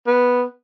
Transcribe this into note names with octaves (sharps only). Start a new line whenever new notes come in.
B3